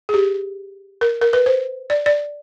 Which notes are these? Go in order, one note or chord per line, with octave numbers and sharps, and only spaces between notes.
G#4
G4
A#4
A#4
B4
C5
D5
D5